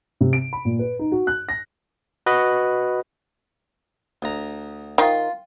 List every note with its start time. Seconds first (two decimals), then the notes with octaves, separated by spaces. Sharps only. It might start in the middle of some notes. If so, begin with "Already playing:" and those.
0.21 C3
0.33 D7
0.53 B5
0.65 A#2
0.79 B4
0.99 D#4
1.12 F#4
1.27 F#6
1.49 A#6
2.26 F#4 B4 D#5
4.22 D2 A#5
4.98 D#3 F4 C6